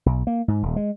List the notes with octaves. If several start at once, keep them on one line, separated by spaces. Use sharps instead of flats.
B1
A#3
G#2
D#1
G#3